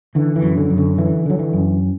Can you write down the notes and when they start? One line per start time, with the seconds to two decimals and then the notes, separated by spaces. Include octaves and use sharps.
0.15 D3 E3
0.36 E3
0.42 F#2
0.57 D3
0.70 F#2
0.78 D3
0.97 D3 E3
1.26 D3 F#3
1.39 E3
1.53 F#2